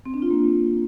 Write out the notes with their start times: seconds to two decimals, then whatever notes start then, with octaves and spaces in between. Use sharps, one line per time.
0.06 C4
0.14 D4
0.22 F4
0.30 A#3